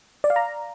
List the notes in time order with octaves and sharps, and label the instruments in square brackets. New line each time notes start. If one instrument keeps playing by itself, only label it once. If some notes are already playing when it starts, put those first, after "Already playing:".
[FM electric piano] D5
F5
A#5